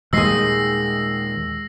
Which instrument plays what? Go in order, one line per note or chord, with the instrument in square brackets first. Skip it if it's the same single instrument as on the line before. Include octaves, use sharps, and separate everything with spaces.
[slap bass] D#2 A#2 D#3 [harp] G#3 G#4 [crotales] E6 A#6 C7